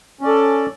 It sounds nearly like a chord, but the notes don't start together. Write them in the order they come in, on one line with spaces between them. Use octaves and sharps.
C#4 D5 A4